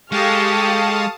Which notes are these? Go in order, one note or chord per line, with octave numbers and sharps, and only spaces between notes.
G#3 G4 A4 F5 A5 C#6 D#6 F6